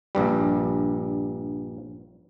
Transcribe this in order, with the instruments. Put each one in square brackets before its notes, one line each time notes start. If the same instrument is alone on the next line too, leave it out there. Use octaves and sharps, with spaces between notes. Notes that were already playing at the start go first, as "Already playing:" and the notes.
[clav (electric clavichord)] A#1 G2 G3